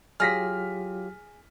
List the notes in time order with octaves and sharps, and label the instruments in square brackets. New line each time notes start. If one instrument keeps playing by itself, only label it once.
[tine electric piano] F#3 F4 G4 [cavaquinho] G#4 [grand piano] F6 A#6 B6